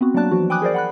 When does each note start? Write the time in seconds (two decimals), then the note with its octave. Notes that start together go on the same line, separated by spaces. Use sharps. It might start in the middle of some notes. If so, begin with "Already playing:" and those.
0.01 B3 C4 F#4
0.14 F#3 A#3 D4 D5 A5 F#6
0.31 E3 F3 F#4
0.50 G5 G#5 B5 D6 D#6 F#6
0.62 G#4 A#4 C5 D5
0.74 F#5 B5 F#6